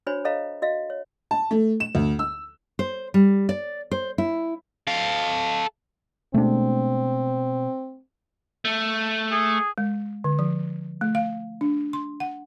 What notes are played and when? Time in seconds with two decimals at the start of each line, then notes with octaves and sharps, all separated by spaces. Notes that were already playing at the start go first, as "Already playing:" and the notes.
0.07 D4 F#4 C5 C#5 G#5 B5
0.25 A4 C#5 D#5 F5 A#5
0.62 F#4 D#5 F5
0.90 C#5
1.31 A5
1.51 A3
1.80 E7
1.95 D2
2.19 E6
2.79 C5
3.14 G3
3.49 D5
3.91 C5
4.18 E4
4.87 A4 F5
6.34 B2 G#3 A3 C4 D4
8.65 A3
9.31 G#4
9.78 G#3
10.24 D3
10.39 F3
11.01 A3
11.15 F5
11.61 D4
11.93 C6
12.20 F#5